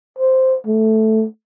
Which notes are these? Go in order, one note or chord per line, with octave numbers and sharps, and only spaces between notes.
C5
A3